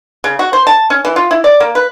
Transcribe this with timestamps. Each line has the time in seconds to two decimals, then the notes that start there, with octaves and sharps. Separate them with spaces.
0.24 C#3
0.39 F#4
0.53 C5
0.67 A5
0.90 C#4
1.05 E3
1.16 F4
1.31 E4
1.44 D5
1.60 A#3
1.75 B4